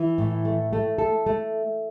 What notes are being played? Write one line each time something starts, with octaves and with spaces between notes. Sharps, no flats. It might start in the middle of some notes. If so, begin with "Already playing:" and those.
Already playing: E3 E4
A2
A3
A3
A4
A3